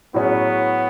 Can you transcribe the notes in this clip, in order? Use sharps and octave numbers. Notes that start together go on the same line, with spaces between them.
A2 F#3 B3 C#4 G#4